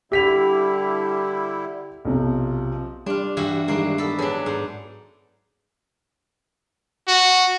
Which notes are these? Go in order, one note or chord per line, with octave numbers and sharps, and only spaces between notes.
D3 G3 E4 G4 B6 F7
B1 C3 F3
G3 D4 F4
G2 E3 F#4
D#3 G3 G#3 A#3 D4
B3 A4
F#3 D4 G#4 A4 B4
G#2
F#4